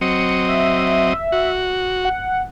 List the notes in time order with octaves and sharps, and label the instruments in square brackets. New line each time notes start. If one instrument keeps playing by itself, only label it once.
[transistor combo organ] F#3 C4 D#5 [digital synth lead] C#7
[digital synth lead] E5
[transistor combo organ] F#4
[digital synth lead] F#5